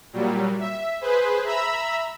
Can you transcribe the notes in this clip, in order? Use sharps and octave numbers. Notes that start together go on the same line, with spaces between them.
A#2 F#3 G3
E5
G#4 B4 C5
E5 A#5 B5 E6